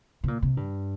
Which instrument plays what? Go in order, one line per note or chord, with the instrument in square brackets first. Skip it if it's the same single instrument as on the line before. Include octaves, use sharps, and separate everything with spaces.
[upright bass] C3
A#2
C3
G2